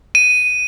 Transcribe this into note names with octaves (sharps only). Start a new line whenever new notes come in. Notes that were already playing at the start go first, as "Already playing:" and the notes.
D#7